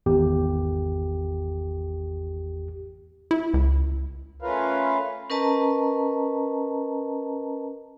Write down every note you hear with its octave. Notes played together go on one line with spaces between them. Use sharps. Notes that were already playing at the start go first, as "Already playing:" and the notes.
G#1 E2 G4
E4
C#2
A3 C#4 F4 A#4 B4 F5
C#4 A#4 B4 D#5 A5 A#5